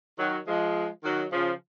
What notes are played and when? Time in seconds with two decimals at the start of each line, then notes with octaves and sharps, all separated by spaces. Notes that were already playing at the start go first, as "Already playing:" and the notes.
0.19 D#3 F#3
0.47 F3 G#3
1.04 D#3 F#3
1.32 C#3 F3